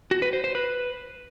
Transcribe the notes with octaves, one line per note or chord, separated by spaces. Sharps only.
F#4
B4
C5
C5
B4